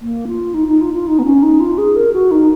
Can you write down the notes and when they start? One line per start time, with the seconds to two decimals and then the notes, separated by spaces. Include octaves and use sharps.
0.01 A#3
0.28 F4
0.54 D#4
0.67 D#4
0.81 F4
0.94 F4
1.07 D#4
1.19 B3
1.25 C#4
1.43 D#4
1.60 F4
1.78 G#4
1.96 A#4
2.13 F#4
2.31 D#4